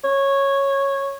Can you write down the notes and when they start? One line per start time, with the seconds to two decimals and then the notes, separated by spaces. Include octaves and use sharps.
0.04 C#5